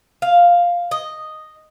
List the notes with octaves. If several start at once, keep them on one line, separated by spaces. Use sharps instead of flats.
F5
D#5